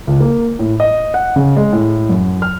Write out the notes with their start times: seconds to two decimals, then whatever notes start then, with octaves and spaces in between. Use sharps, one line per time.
0.07 C#2
0.20 A#3
0.59 A2
0.80 D#5
1.14 F#5
1.36 C#3
1.56 G#3
1.73 A2
2.09 F#2
2.42 F6